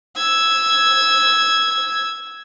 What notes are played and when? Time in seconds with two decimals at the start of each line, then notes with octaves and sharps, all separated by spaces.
0.17 E6 G#6